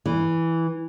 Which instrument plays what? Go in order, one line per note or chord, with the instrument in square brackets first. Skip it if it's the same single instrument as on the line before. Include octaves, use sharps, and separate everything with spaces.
[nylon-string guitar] E3